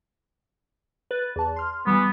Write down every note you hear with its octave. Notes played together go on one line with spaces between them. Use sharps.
B4 F#6 A6
E2 A5
C6 F6
E3 G3 B3